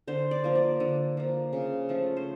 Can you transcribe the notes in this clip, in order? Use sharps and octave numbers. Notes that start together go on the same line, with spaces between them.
D3 C5
D5
F3 A#3
D5
D3
F3 A#3
C#3
F3 A3
C5